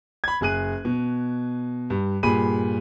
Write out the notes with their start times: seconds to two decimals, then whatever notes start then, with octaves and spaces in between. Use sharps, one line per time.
0.24 B5 G#6
0.41 F#1 G#4 F#6 D#7
0.85 B2
1.90 G2
2.23 G2 A#2 G#4 B5 D#7